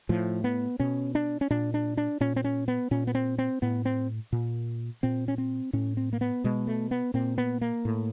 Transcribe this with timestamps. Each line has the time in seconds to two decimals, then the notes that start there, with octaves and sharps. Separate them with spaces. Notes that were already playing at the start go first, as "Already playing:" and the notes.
0.09 A2 F3
0.44 B3
0.79 B2 C#4
1.15 D4
1.41 C#4
1.50 A#2 D4
1.74 D4
1.97 D4
2.20 A#2 C#4
2.36 C4
2.44 C#4
2.68 B3
2.91 A#2 C#4
3.07 B3
3.15 C4
3.38 C4
3.62 A2 B3
3.85 C4
4.33 A#2
5.03 A#2 C4
5.28 C#4
5.38 C4
5.73 A2 C#4
5.97 C4
6.13 A#3
6.21 B3
6.44 B2 G#3
6.67 A3
6.91 B3
7.14 A#2 C4
7.38 B3
7.61 A#3
7.85 A2